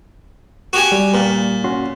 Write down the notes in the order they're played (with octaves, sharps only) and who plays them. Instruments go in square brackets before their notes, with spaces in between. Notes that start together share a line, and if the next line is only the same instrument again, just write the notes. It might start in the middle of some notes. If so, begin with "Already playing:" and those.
[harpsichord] F#4 G4 G#5
[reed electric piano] G3
[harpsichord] A#2
[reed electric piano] C#4 F#4 C6